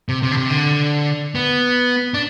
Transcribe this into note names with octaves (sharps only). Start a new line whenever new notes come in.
C3
C3
D3
C3
D3
B3
D4